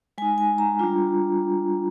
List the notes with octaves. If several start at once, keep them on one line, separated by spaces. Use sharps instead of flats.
G#3 D#4 G#5
G#5
A#5
G3 D4 F4